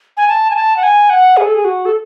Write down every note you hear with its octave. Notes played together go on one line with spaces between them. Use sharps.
G#5
A5
G#5
A5
F#5
G#5
F#5
G#4
A4
G#4
F#4
A4